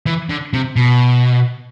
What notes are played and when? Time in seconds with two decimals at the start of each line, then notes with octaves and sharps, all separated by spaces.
0.07 E3
0.30 D3
0.54 C3
0.76 B2